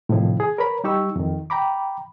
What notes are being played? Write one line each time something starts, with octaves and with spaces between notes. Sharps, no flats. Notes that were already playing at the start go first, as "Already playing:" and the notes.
A2 C3 D#3 F3 E4
G#4
A#4 B4 C#5 A#5 B5
G3 D#4 G4 C#6 E6
F2 D#3
G5 A#5 B5 D6